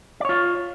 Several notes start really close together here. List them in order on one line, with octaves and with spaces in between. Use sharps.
D5 C#5 F4